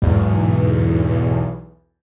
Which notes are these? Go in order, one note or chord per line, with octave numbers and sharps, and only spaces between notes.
B1 E2 G#2